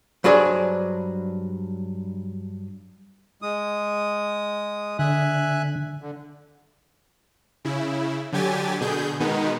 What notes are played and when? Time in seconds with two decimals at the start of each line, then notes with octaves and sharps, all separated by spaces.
0.24 G2 F#3 D4 G#4 C5 D5
3.42 G#3 D#6
4.99 D3 E5 G#5 F#6
6.02 D3
7.65 C#3 E4
8.32 D3 F#3 G4 G#5 A6
8.81 B2 D3 G#4 G6
9.20 B2 D#3 G#3 B3 D#4